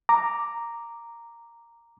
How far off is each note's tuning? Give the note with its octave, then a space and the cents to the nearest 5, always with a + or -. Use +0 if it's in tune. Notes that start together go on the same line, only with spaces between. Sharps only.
A#5 -5 D6 +0